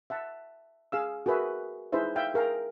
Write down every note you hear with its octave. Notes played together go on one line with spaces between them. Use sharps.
E5 F#5 A5
G#4 F5 E6
F#4 G#4 A#4 B4 E5
D#4 E4 G#4 B4 C5 E5
E5 F5 G5
G#4 A#4 F5 G5 A#5